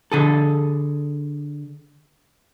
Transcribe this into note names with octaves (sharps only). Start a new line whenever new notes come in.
D3 G#4 A4